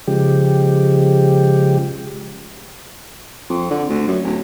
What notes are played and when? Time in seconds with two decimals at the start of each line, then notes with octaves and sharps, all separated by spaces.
0.07 C#3 F3 G#3 G4
3.50 F2
3.70 D3
3.89 D2
4.07 F#2
4.24 D1